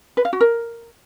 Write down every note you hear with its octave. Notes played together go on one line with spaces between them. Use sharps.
B4
F5
F#4
A#4